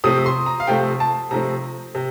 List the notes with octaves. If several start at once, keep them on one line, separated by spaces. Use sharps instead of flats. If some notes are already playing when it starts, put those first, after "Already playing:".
C3 F3 A3 C4 D#6
C6
A#5
F5
C3 F3 A3 C4 G5
A5
C3 F3 A3 C4 A#5
C3